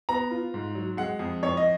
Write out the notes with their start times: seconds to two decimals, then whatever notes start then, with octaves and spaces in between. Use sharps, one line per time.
0.09 B3 A#5
0.31 F4
0.54 G#2
0.75 F#3
0.97 G#3 F#5
1.19 F2
1.43 F2 C#5
1.57 D#5